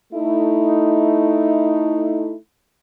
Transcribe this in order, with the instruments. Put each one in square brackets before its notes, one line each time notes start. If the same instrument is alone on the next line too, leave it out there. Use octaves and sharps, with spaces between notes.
[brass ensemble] A3 D#4 E4